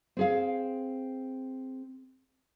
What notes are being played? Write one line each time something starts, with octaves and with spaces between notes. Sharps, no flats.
C4 G#4 F5